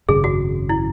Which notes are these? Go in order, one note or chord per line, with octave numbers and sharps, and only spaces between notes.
G#1 F#2 C#3 F#3 G#4
F#4
E4